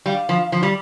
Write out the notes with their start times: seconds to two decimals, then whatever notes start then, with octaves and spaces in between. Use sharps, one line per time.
0.06 G3 F5
0.29 F3
0.52 F3
0.63 G3